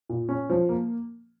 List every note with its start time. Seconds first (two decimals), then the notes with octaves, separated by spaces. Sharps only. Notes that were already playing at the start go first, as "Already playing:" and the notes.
0.09 A#2
0.29 C#4
0.50 F3
0.69 A#3